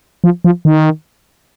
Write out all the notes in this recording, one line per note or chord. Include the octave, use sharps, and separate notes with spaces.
F3
F3
D#3